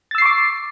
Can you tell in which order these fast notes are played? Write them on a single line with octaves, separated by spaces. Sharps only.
A6 E6 C7 C#6 D6